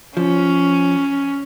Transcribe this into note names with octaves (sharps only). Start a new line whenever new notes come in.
F3 C#4